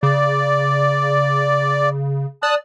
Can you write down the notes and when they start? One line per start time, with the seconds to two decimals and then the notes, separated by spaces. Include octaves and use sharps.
0.03 C#3 D5
2.43 D5 A5 D#6 F#6